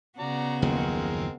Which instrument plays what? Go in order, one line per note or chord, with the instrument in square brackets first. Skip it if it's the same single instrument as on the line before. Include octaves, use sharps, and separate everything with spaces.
[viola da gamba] C#3 B3 F#4 [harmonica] D5 A#5
[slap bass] F#1 D#2 F3 [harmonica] G#3 C4 A#4